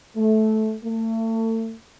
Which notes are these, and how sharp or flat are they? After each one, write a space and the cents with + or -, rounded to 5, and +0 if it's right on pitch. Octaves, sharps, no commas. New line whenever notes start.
A3 -15
A3 +35